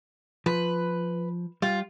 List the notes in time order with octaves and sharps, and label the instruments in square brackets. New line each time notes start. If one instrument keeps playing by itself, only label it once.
[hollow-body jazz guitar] F3 [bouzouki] B4
[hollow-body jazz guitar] G3 [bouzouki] F4